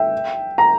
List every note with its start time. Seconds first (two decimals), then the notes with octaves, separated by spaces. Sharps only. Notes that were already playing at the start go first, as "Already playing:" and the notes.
Already playing: E5 G5
0.58 A#5